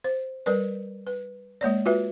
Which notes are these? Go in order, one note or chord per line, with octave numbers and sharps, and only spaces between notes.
C5
G3 A#4 B4 D5
B4
G#3 A#3 C#5 D5
F4 F#4 B4 E5